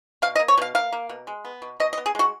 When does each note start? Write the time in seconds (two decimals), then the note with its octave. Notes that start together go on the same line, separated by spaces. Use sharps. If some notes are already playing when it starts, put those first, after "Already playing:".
0.22 B2 F5
0.36 D#5
0.40 A#3
0.48 C#5
0.58 B2 F5
0.75 A#3 F5
0.92 A#3
1.09 B2
1.27 G#3
1.45 B3
1.62 B2
1.80 B2 D#5
1.93 D#5
1.98 B3
2.06 G#4
2.15 G#3 F#4